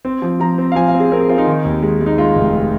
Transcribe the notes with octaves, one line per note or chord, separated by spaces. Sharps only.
C4
F3
F3 A#5
C4
F5
F3 G#5
F5
C4
G#4
C4 A#4
G#4
C4 F4
D#4
D#3
D#2
G#3
G#3
D#4
G#3 F4
F1